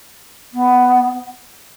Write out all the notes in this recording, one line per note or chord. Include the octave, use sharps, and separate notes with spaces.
B3